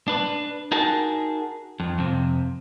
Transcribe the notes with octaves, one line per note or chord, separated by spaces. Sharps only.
D4 B4
D#4 F#4 G#4 A#4 A5
F2
F2 C3